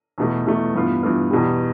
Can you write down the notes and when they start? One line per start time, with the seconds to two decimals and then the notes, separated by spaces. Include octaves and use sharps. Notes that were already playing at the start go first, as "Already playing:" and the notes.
0.18 E2 B2 A3
0.46 E2 B2 A3
0.75 G2 E3 B3 F4
1.03 G2 E3 B3 F4
1.31 E2 B2 G3